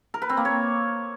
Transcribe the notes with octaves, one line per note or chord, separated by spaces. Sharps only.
A#4
B4
C4
A#3
C#5